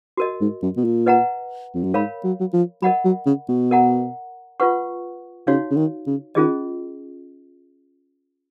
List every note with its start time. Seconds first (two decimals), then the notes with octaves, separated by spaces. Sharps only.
0.17 F#4 A#4 D#5
0.41 G#2
0.62 F#2
0.77 B2
0.84 A#2
1.06 B4 D#5 F#5 A#5
1.74 F2
1.84 F#2
1.94 G#2 A#4 C#5 F5 B5
2.24 F#3
2.40 F#3
2.53 F3
2.82 F#3 A#4 D#5 F#5 B5
3.05 F#3
3.26 C#3
3.49 B2
3.71 A#4 D#5 F#5 A#5
4.60 F4 B4 F#5 C#6
5.47 C#3 D#4 F#4 C#5 F5
5.71 C#3
5.76 D#3
6.06 C#3
6.35 D#3 C#4 F4 G#4 D#5